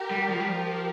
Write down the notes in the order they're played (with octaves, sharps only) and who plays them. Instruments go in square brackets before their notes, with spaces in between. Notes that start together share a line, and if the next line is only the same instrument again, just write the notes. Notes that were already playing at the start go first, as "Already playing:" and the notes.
Already playing: [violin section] G4 A#4
[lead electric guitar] G3
F3
G3
[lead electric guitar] F3 [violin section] G4 A#4